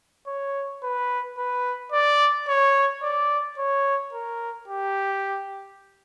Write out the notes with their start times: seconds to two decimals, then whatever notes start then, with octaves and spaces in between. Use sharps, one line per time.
0.27 C#5
0.83 B4
1.38 B4
1.92 D5
2.48 C#5
3.03 D5
3.58 C#5
4.13 A#4
4.68 G4